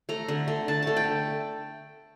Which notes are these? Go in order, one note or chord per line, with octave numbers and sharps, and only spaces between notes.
A3 A#5
D3
A3
D3 A5
A3 A5
G5